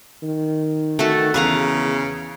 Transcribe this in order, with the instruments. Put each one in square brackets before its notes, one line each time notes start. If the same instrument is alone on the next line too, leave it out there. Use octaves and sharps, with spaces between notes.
[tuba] D#3
[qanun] A3 F#4 A4
[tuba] E2 [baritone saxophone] C#3 [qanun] B4 F5 A#5